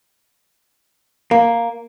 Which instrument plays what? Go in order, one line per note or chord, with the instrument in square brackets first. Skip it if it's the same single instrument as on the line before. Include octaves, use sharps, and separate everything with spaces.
[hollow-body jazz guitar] A#3